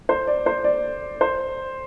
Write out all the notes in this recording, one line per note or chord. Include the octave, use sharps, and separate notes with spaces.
C5
D5
C5
D5
C5